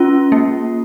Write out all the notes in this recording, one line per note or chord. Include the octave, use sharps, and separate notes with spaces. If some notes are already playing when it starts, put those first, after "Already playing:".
Already playing: C#4 F4
A#3